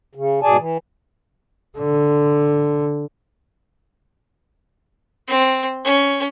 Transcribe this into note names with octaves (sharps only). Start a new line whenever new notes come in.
C#3
G#2 B2 G#4 D5 G#5 A5
E3
D3
C4
C#4